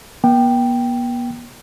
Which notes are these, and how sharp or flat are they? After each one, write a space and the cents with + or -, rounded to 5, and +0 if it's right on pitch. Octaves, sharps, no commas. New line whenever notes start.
B3 -45 G5 -5